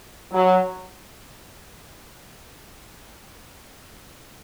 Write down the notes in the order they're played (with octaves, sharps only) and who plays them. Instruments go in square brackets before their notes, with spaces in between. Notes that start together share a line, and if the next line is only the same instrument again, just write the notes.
[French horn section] F#3